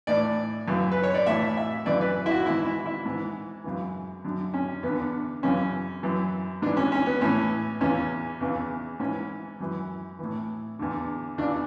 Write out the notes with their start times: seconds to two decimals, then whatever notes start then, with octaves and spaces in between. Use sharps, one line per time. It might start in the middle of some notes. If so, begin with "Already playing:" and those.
0.07 A2 E3 D5
0.68 F#2 C#3 E3
0.92 B4
1.03 C#5
1.14 D5
1.26 A2 E3 E5
1.57 E5
1.86 F#2 C#3 E3 D5
2.01 B4
2.26 E4
2.31 F#4
2.46 G#2 E3 E4
2.66 E4
2.86 E4
3.06 G#2 E3
3.64 F#2 C#3 E3
4.25 F#2 D3
4.54 C#4
4.83 E2 B3
4.89 D3
5.43 F#2 C#3 E3 C#4
6.03 F#2 E3
6.62 G#2 D4
6.66 E3
6.77 C#4
6.92 C#4
7.06 B3
7.21 A2 E3 C#4
7.81 E2 C#3 E3 C#4
8.41 E2 C#3 E3
9.00 G#2 E3 C#4
9.60 F#2 E3
10.19 A2 E3
10.79 E2 D3
11.38 E2 C#3 E3 D4